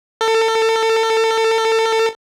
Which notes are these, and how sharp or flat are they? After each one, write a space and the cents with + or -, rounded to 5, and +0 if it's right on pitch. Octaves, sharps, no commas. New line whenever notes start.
A4 +30